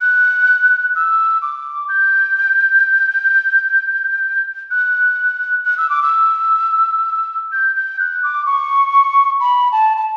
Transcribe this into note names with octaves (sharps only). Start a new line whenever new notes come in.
F#6
E6
D6
G6
F#6
F#6
E6
D6
E6
G6
G6
F#6
D6
C#6
B5
A5
A5